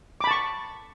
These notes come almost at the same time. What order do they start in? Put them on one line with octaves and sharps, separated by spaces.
D6 B5 A5 C#6